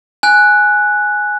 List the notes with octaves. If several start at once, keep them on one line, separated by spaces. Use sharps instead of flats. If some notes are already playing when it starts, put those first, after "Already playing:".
G#5 F#6